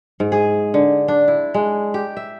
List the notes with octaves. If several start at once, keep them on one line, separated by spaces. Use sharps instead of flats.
G#2
G#4
D3
D4
E4
G#3
G4
E5